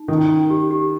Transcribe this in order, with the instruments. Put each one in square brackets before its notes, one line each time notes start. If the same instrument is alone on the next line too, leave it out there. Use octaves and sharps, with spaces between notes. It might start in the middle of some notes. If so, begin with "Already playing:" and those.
Already playing: [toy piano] D#4
[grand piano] D#3 [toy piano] C#4
[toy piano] C#4
G4
G4